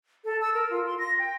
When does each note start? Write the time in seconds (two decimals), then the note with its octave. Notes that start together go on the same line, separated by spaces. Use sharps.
0.25 A4
0.41 E6
0.54 A#4
0.70 F4
0.87 C6
0.99 A#6
1.19 G5